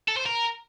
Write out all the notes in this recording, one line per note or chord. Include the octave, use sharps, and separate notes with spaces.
A4
C5
A#4